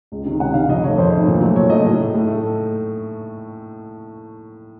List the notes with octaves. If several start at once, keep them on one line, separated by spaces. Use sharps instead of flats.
C#2
C3 D#3
C#2 F#5
C3 D#3 F5
F2 D#5
D#3 A3 C#5
F2 C5
D#3 A3
A#2
F#3 A3
A#2 C#5
F#3 A3 D#5
A2
A3
A2
A3